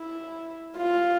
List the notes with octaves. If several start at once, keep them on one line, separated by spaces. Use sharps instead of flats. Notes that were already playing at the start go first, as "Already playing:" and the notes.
Already playing: E4
F4